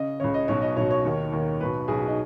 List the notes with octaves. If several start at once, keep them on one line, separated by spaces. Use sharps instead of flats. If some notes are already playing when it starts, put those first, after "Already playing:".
Already playing: C#3 D#5
C#2 C#3 C#5
D#5
B1 B2 C#5
D#5
B1 B2 C#5
C#5
D#2 D#3
D#2 D#3
B1 B2 B4
B1 B2 G#4
F#4
D#4